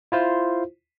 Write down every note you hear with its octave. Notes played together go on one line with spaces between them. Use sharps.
E4 F4 C5